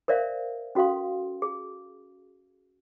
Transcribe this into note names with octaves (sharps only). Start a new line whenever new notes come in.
A#4 C5 D5 E5 F5
C#4 F#4 A4 F5 C6
G#4